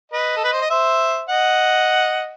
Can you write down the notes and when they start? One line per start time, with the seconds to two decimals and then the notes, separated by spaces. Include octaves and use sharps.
0.12 B4 D#5
0.36 A4
0.44 B4
0.53 C5
0.62 D#5
0.70 C5 E5
1.29 D#5 F#5